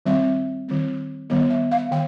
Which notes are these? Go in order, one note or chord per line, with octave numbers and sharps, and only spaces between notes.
D#3 G3 C4 E5
D#3 G3 C4
D#3 G3 B3 D#5
E5
F5
D#3 G5